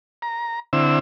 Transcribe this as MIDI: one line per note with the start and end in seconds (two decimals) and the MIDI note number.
0.22 0.60 82
0.73 0.99 50
0.73 0.99 60
0.73 0.99 64
0.73 0.99 88